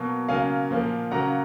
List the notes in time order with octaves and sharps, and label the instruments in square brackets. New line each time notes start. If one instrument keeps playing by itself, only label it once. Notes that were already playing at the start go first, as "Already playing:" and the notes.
Already playing: [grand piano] B2 F#3 A#3
C#3 F#3 A#3 F5 G#5
A#2 F3 A#3
C#3 F#3 A#3 F#5 A#5